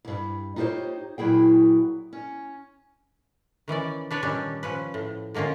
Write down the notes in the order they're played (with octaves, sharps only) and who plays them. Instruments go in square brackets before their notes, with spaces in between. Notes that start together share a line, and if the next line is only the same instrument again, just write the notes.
[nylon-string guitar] D2 G2
D#4 F4 G4 A4 C5 C#5
A#2 F#3 E4 G#4 G5
C#4
[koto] D#3 E3 C#4 D5
D4 B4 C#5 D5
A#2 D#3 G3 C#4 D4
F3 C#4 B4
A2
D3 D#3 A#3 C#4 F4